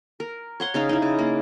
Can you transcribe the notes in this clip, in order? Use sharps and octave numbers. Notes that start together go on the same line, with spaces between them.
A#4
C#5 F#5 C6
C#3 D#4 F5
D#4 E4
C#3
A#3